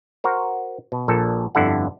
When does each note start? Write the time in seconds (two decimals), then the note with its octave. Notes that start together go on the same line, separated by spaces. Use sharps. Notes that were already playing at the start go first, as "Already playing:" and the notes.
0.24 F#4 A#4 C5
0.92 B2
1.08 A#1 A#2 A4
1.55 G1 F2 D3 E4 A4 F#5